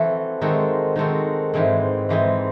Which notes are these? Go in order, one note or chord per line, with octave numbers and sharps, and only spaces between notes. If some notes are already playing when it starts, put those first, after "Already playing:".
Already playing: E3 C4 F#4 A4
D#3 G#3 C4 F#4 A4
D#3 G#3 C4 F#4 A4
G#2 E3 G#3 C4
G#2 E3 G#3 C4